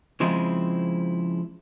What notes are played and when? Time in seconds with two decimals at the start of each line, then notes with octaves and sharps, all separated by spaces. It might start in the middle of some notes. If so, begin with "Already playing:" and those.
0.20 C#3 F3 G#3 C4 E4